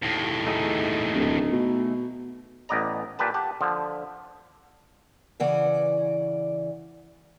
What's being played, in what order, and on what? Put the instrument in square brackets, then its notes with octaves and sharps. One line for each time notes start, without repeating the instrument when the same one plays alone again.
[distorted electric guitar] D#2 A2
[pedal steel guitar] A3 D#4 G#4
[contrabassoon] D1
B2
[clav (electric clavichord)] A1 B3 D5 D#5 A#5
A#2 G4 B4 A5
G4 F#5 A5
D3 F3
[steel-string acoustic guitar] C#3 E3 D5 F#5